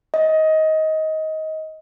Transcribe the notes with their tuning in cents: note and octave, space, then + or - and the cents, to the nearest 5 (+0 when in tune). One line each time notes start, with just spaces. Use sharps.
D#5 +20